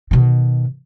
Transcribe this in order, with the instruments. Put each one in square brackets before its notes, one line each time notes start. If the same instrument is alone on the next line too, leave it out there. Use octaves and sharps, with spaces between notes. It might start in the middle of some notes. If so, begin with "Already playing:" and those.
[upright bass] B2 D#3